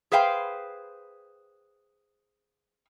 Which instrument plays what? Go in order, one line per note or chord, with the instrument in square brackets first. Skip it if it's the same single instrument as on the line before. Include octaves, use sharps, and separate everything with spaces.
[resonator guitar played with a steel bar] G#4 B4 C5 F5 G5